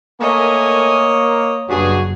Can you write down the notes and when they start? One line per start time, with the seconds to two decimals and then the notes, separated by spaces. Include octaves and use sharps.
0.21 A3 A#3 A#4 C#5 D#5 G#5
1.69 F#1 G2 F#4 G#4